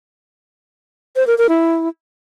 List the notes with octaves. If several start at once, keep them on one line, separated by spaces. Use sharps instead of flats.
C5
A#4
A#4
E4